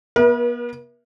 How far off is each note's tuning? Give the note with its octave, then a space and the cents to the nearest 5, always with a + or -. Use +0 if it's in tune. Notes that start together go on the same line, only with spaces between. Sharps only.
B3 -40 A#4 +45 E5 +0